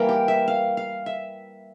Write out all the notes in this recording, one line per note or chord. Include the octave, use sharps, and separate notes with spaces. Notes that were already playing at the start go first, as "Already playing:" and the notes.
Already playing: E3 G3 A#3 A#4
G4
E5
F5
F5
E5